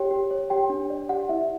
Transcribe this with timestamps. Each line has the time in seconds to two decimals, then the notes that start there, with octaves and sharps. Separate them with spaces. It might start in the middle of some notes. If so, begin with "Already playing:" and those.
Already playing: G4 C#5 G5
0.11 G4
0.31 C#5
0.50 G4 G5
0.70 D4
0.90 D5
1.09 G4 F#5
1.29 E4 E5